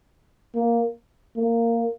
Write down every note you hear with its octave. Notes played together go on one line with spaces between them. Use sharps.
A#3
A#3